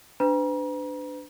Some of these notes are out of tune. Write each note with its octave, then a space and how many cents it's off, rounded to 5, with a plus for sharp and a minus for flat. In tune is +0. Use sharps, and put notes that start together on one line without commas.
D4 +5 B4 +35 A#5 +35